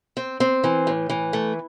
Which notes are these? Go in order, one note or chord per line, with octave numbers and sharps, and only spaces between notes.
C4
C4
E3
A2
E3
A3